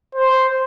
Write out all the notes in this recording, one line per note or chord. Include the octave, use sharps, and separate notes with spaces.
C5